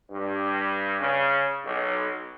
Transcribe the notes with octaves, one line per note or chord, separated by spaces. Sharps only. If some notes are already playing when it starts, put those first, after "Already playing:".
G2
C#3
B1